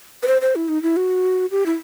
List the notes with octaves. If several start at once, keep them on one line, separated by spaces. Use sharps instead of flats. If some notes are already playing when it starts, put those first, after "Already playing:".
B4
C5
C5
E4
D#4
E4
F#4
G4
E4